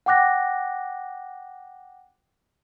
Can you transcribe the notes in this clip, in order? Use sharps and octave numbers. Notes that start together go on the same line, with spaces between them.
F#5 G5 D6 F#6 A#6